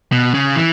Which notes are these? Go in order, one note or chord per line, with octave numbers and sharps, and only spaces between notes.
B2
C#3
E3